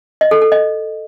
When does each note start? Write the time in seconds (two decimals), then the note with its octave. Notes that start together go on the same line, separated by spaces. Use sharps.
0.21 D#5
0.31 A4
0.42 A4
0.52 D#5